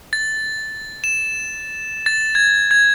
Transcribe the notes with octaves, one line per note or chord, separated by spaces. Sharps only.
A6
E7
A6
G#6
G#6